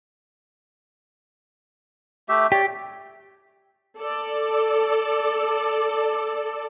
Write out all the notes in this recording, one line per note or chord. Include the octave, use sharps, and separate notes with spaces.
A3 G4 E5
G4 C#5 D5
A4 D5